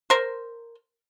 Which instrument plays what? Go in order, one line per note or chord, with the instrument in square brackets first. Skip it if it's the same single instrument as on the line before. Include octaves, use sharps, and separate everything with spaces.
[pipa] A#4 C5